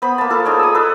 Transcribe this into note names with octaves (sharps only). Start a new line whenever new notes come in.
B3 C5 B5
A#3 A5
F4 A4
D#4 G#4 C#5 D5
D#6 E6
A4 B4